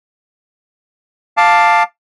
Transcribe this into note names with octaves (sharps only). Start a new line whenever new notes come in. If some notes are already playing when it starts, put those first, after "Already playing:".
F5 A5 D6